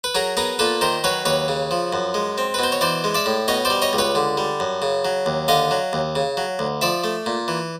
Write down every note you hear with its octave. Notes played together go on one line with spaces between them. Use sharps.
B4
F#3 G#4 A#4
B3 G#4 A#4
A#2 A4 B4
D#3 A#4 C5
F#3 B4 C#5
D#2 B4 C#5
C#3
F3
F#2
G#3
C4
B4
B2 C5
C#5
E3 C5 D5
G#3
D5 E5
A2
B2 C#5 D#5
C5 D5
G3
C#5 D#5
C#2
B4 C#5
D3
G3
F#2
C#3
F#3
D#2
D3 D#5 F5
F#3
D#2
C#3
F#3
D2
F3 D5 E5
A3
A#2
E3